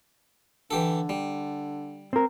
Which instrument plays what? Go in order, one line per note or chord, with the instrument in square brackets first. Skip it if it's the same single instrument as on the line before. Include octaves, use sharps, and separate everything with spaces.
[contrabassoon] D3 [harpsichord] E3 G4 A4
[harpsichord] G3
[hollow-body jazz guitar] C4 A#4